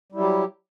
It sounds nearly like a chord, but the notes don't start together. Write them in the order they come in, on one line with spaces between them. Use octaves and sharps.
G3 E4 F#3 G4